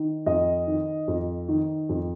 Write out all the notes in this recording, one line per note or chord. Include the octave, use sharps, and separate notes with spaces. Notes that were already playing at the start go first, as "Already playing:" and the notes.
Already playing: D#3
F2 D#5
D#3
F2
D#3
F2